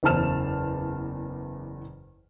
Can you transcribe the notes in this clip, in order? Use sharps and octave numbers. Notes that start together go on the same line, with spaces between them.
F#1 E2 C5 A5 F6 E7